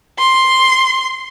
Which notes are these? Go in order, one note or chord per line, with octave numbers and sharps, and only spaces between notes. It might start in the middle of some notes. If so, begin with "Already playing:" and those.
C6